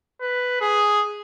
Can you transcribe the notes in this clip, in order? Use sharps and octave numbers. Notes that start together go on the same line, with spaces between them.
B4
G#4